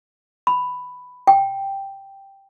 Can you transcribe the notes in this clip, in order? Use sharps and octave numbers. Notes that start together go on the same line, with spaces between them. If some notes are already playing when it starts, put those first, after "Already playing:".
B5
G5